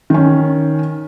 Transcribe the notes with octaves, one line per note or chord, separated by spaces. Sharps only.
D#3 C#4